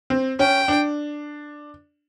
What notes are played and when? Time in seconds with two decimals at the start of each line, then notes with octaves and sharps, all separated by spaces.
0.10 C4
0.39 C#4 G5
0.68 D4